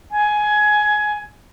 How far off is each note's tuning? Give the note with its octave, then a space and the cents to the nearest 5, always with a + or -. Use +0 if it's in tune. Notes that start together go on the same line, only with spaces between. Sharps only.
G#5 +15